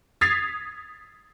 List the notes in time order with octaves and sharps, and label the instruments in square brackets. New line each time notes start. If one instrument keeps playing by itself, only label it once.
[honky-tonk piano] D#6 G#6 A6 B6 C7 F7